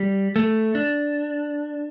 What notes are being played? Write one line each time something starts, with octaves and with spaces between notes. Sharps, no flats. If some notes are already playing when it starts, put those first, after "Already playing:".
Already playing: G3
A3
D4